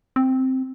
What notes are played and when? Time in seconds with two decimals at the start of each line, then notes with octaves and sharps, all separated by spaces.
0.16 C4